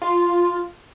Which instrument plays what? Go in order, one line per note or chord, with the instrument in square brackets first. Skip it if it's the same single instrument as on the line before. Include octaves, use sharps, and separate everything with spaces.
[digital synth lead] F4